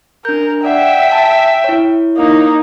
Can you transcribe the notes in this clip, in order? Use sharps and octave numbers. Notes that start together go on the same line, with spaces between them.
D4 A#4 G6
D5 E5 F#5 G5
G#5 A5
E4 C#5
A#3 D#4